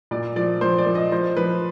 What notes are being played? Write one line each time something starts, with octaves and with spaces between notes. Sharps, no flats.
A#2 D5
F3 D5
F3 C5
D5
F3
D#5
F3 C5
F3 B4